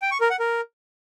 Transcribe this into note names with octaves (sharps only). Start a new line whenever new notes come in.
G5
C#6
A#4
F#5
A#4